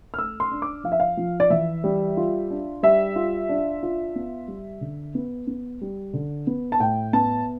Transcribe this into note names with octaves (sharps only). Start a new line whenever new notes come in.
F6
A3 E6
C6
D4
D6
F3 F5
E5
F5
F3
D5
E3 E5
G3
F4
D4
G3 E5
F4
D4
F4
B3
G3
D3
B3
B3
G3
D3
B3
A5
A2 G5
B3 A5